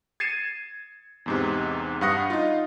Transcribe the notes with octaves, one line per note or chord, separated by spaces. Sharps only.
G#6 A6 C7 C#7 D#7 E7
E2 G#2 C3
G2 F5 F#5 D#6 A#6 C#7
D#4 F4